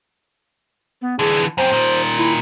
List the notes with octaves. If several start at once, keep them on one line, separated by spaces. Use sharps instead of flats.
B3
D3 E3 G#4
F#2 C4 C5
A#2 D#3
E4